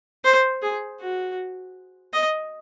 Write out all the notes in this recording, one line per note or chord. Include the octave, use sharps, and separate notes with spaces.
C5
G#4
F#4
D#5